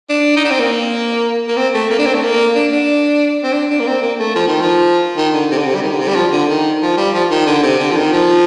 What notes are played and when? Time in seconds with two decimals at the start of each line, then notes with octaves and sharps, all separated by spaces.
0.09 D4
0.36 D#4
0.44 D4
0.51 C4
0.59 A#3
1.48 A#3
1.57 C4
1.74 A3
1.90 A#3
1.99 D4
2.06 C4
2.14 A3
2.23 A#3
2.55 D4
2.72 D4
3.44 C4
3.53 D4
3.70 D4
3.80 A#3
3.87 C4
4.02 A#3
4.19 A3
4.35 F3
4.48 D#3
4.61 F3
5.17 D#3
5.34 D3
5.51 C3
5.58 D3
5.66 C3
5.75 G3
5.83 D#3
5.91 D3
6.00 C3
6.08 G3
6.15 F3
6.32 D3
6.49 D#3
6.82 F3
6.97 G3
7.14 F3
7.31 D#3
7.47 D3
7.63 C3
7.79 D3
7.91 F3
7.96 D#3
8.12 F3